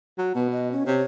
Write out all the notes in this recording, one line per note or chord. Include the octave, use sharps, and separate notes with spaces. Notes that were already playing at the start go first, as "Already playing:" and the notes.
F#3
B2 B3
D#5
C#4
C3 C#5